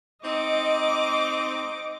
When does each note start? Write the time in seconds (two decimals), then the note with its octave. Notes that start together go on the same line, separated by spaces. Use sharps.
0.25 C4 D#4 D#5 D6